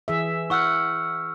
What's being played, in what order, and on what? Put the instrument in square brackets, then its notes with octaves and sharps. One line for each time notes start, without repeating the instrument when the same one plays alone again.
[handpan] E3 G#4 E5
[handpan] E4 F#5 [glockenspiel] C#6 E6 F6